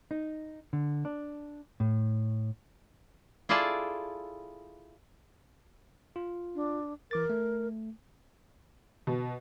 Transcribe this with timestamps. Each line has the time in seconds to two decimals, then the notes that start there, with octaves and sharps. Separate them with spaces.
0.11 D#4
0.73 D3
1.05 D4
1.80 A2
3.49 E4 F4 G#4 A4 D5 A5
6.16 F4
6.55 D4
7.11 E3 A#4 D6 A6
7.30 A3
9.07 B2